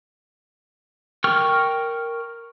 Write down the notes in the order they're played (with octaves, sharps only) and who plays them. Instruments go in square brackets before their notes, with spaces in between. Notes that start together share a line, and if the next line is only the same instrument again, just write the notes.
[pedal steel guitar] A#4 G5 C#6 F6